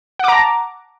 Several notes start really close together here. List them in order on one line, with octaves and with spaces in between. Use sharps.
F#5 D6 A#5 A5